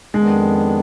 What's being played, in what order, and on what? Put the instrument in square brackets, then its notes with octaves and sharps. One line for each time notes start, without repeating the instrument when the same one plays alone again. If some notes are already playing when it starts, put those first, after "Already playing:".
[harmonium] F2 D#3 B3 D4 [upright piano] G#3